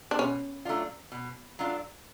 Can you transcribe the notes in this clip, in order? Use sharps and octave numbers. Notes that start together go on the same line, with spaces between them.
D4
B2 C#4
F#3 A3 D4 F4
B2
F#3 A3 D4 F4